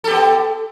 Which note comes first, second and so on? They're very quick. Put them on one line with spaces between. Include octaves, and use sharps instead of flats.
A4 G4 B3